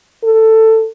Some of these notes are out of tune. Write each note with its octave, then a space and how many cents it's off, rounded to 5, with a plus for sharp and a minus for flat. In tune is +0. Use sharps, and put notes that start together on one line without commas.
A4 +15